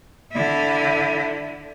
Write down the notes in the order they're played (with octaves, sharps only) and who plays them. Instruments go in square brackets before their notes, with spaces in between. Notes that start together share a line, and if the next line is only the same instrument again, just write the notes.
[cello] D3 E4